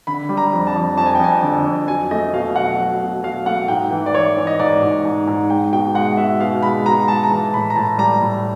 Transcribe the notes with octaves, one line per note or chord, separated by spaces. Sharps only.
D3 B5
G3
A#5
F2
A5
F2
F2 A5
G#5
G5
F2 G#5
D3
F2
F#3 G#5
A3 D#5
B2 F5
F#3 F#5
F#3
B2
F#3 F5
A3 F#5
G#2 G5
E3
D5
E3 C#5
E3
D#5
G#2 D5
G#2
G#2
G#2
G#3 G5
B2 G5
G#3 F#5
B2 E5
B2 F5
G#3 B5
B2 A#5
G#3 A5
A#5
E3 A5
A2 B5
A#5
A2 A5
G3 A#5
A2